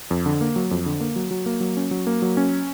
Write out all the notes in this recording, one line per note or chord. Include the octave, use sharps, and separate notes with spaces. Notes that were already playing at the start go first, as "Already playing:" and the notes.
F2
D3
A#3
F#3
F2
D3
A#3
F#3
F#3
A#3
F#3
C#4
F#3
A#3
F#3
C#4